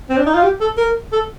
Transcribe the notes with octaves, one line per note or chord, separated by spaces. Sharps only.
C4
D4
D#4
F4
G4
A4
A#4
A4